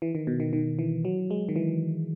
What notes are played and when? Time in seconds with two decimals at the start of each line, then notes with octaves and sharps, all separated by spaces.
0.02 E3
0.15 D#3
0.27 B2
0.40 D#3
0.53 D#3
0.79 E3
1.05 F#3
1.31 G#3
1.49 D#3
1.56 E3